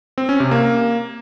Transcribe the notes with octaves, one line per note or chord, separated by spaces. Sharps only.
C4
C#4
C3
A#3